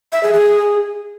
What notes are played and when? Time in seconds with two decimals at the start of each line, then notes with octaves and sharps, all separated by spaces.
0.13 E5
0.23 G#4
0.34 G#4